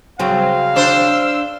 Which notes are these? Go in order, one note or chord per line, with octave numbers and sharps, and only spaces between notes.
C#3 F#3 C4 F5
D4 C5 E6